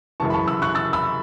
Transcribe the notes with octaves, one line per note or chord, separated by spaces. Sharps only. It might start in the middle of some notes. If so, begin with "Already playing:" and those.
F#2 C#3 E3 A5 C#6
B5
A5 C#6
B5 E6
C#6 F#6
E6 A6
B5 E6